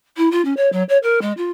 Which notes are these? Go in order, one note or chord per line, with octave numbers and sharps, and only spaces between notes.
E4
F4
C#4
C#5
F#3
C#5
A#4
G#3
F4